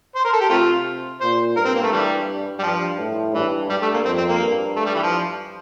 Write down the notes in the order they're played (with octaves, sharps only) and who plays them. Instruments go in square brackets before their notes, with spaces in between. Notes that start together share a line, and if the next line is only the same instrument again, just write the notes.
[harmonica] C5
A#4
A4
G4
[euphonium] C3 [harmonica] A3 C4 F4
[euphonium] A#2 [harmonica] C5
[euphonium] G2 [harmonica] A#4
[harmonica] C4
A#3
A3
E3 G3
G3
[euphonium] G2 [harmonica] F3
[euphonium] A2
[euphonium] G2 [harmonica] E3
[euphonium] G2 [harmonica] G3
[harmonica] A3
A#3
[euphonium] F2 [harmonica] C4
[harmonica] C4
A#3
[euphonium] G2
[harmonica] A3
G3
E3
F3